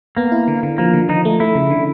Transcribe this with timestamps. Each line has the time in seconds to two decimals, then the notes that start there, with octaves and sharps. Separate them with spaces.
0.17 A#3 B3
0.32 E4
0.48 D3
0.63 D3
0.78 F3 A#3
0.94 D3
1.09 F3 D#4
1.25 A3
1.40 A3 E4
1.55 C#3
1.70 D3